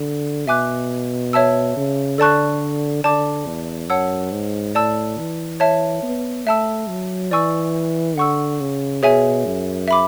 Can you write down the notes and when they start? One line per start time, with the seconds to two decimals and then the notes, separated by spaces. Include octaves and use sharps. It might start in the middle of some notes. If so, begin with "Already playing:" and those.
Already playing: D3
0.47 B2 E5 G#5 D6 F#6
1.33 C#5 E5 A5 E6
1.76 C#3
2.18 D3 A4 D5 A5 C#6 F#6
3.04 D3 D5 A5 D6
3.46 E2
3.89 F#2 C#5 F#5 A5 E6
4.32 G#2
4.75 A2 D5 A5 E6
5.18 E3
5.60 C#5 E5 A5
6.03 B3
6.46 A3 E5 A5 E6
6.89 F#3
7.31 E3 D5 G#5 C#6 E6
8.17 D3 F#5 C#6 E6
8.61 C#3
9.03 B2 G#4 C#5 E5 G#5
9.45 F#2
9.88 E5 B5 D6